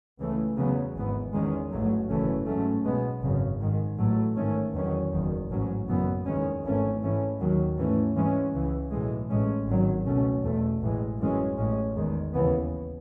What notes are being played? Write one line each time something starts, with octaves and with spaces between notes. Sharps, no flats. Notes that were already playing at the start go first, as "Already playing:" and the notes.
C#2 C#3 E3 A3
E2 C#3 F#3 B3
G#1 G#2 E3 B3
E2 D#3 G#3 C#4
A1 G#2 F#3 A3
F#1 F#2 E3 A3 C#4
G#2 F#3 A3 C#4
B1 B2 G#3 B3
G#1 F#2 C#3
G#2 D#3 G#3
A1 A2 F#3 A3
G#2 D#3 A3 C#4
E2 D#3 F#3 C#4
F#1 E2 D#3
A1 G#2 F#3 C#4
F#1 F#2 E3 B3
E2 D#3 G#3 C#4
G#1 G#2 E3 A3 C#4
G#2 E3 A3 C#4
D#2 D#3 F#3
G#2 E3 A3 C#4
G#2 E3 G#3 C#4
C#2 C#3 E3
B1 A2 E3 G#3
A1 A2 G#3 C#4
G#1 G#2 D#3 F#3
C#2 B2 A3 C#4
E2 B2 A3
A1 A2 E3 G#3
F#2 E3 G#3 C#4
A1 A2 G#3 C#4
E2 D#3 G#3
D#2 C#3 E3 B3